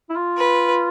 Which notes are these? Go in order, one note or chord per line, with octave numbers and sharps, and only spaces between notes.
E4
F4
B4